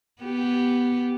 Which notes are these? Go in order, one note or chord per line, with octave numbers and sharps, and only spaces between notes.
B3 G4